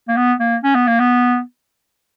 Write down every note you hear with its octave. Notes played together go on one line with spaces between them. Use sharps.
A#3
B3
A#3
C#4
B3
A#3
B3